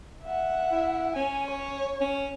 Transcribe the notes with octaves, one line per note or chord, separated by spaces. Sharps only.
E5 F#5
E4
C#4 G#5
C#5
C#4